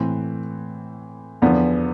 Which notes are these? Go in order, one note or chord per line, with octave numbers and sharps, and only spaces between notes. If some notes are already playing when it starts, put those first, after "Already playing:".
Already playing: A2 E3 C4
E2 D3 F3 B3